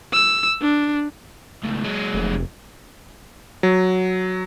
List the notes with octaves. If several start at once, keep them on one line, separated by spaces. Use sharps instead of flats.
E6
D4
C#2 A2
F#3 G#3
F1
F#3